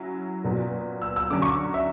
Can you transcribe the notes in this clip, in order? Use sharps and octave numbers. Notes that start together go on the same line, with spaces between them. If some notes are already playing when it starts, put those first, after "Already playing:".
Already playing: F#3 C#4 E4
A#2 F#3 B3 F#4
E6
E6
D3 F#3 C#4 D6
C#6
E5